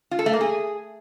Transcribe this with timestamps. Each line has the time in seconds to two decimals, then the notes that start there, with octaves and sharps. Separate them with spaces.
0.11 F4
0.19 A4
0.26 A3
0.33 A#3
0.41 G#4